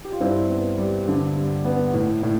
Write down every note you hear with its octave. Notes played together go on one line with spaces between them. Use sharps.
G4
F4
G2 C4 E4
B3
G3
D3
G2
B3
A2
A2